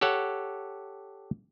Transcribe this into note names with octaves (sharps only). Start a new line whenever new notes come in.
G4 A4 C#5 F#5